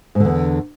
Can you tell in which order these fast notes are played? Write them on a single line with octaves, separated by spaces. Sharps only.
G#2 D3 E2